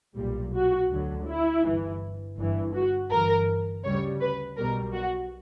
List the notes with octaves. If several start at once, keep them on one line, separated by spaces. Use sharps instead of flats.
B1 A#2 G3
F#4
D2 D3 F#3
E4
G1 G2 E3
G1 G2 E3
F#4
G1 G2 E3 A#4
D2 C#3 G3 C#5
B4
B1 B2 G3 A#4
F#4